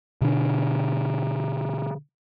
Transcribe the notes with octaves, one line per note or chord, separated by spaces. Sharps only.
B2 D3 D4